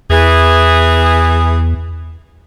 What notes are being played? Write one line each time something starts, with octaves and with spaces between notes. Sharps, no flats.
E2 E3 G#4